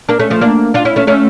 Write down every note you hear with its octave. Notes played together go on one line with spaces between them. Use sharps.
A#3 D4
A3 C#4
F3 A3
A#3 D4
D4 F4
C#4 E4
A3 C#4
A3 C#4